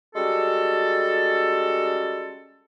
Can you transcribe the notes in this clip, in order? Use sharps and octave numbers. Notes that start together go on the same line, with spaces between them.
G3 G#3 C#4 F#4 A4